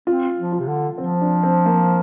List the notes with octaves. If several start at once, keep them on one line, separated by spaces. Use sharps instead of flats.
C4 F4
F3
F4
C3
D3
F3 C4
D4
C4
A#3